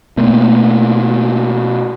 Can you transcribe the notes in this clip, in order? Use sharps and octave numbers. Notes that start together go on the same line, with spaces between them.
B2 A3 A#3